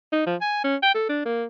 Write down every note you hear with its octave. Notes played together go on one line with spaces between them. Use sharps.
D#4
F3
G#5
C#4
G5
A4
D4
A#3